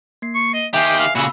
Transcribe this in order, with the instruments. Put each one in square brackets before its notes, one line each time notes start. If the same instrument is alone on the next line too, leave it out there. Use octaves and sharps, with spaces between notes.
[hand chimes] A#3 C7
[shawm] C#6
D#5
[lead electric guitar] D#3 G4 [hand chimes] E5 G#5 C7 [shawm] G5
[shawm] F5
[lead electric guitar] A#2 C#3 [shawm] F#4 [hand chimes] B5 E6